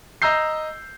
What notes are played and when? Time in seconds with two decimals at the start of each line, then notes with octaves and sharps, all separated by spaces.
0.22 D#5 A#5 E6 G6 C7